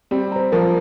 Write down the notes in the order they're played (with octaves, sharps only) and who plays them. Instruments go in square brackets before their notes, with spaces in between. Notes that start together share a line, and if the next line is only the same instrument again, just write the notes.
[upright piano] G3 C4 [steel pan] G4
[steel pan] C5 A#5
[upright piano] F3 A#3 [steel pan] A#4